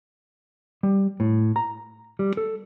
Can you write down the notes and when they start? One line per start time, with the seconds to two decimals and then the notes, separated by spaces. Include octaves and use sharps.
0.83 G3
1.20 A2
1.56 A#5
2.19 G3
2.37 A4